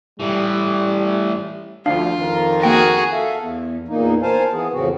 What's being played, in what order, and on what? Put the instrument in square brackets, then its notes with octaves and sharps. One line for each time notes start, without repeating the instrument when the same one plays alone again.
[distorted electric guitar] A2 E3 [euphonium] G3
[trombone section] D2 F3 [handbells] D4 F5 [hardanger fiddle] F4
[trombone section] F2 D#3 A#4
[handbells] A#3 G5 A#6 [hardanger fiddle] F#4 G#4
[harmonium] A4 E5 F5
E2
E2 A#2 A#3 D#4
A#4 C5 F5 G#5 A5
E3 B3 G#4
F2 A2 C#3 C4 F#4